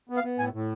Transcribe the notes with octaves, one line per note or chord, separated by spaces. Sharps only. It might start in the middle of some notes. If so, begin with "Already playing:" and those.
B3
F5
B3
A2 G#5
A2